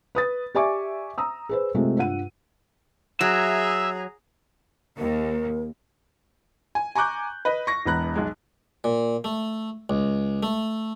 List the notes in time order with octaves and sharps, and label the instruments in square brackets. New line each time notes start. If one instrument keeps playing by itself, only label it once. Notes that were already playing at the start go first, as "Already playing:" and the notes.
[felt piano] B4 D#6 A6
G4 D5 E5 G#5 C#6 D6
A#5 D#6 E6
G#4 B4 C5
C3 G#3 A3 C4 F4
G2 F4 F#5 D#7
[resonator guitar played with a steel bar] F#3 [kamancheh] G#4 A#5 [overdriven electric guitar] E5
[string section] D#2 [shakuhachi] A#4
[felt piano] G#5
G#5 A#5 C#6 D6 F#6 G6
B4 D#5
C#6 A#6
E1 E2 B3 A#5 B5 F#6
B1 G#3
[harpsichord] A#2
A3
C#2
A3